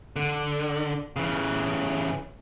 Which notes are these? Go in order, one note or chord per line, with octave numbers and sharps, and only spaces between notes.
D3
C#3 E3